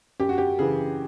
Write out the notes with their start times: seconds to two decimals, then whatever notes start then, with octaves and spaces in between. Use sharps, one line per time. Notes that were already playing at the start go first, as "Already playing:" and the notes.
0.20 F#2 G4
0.29 F#4
0.38 G4
0.59 C#3 E3 G#4